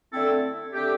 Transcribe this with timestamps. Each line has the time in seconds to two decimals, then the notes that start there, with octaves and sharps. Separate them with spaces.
0.11 D3 A3 C4 E4 A4
0.73 D3 A3 C4 G4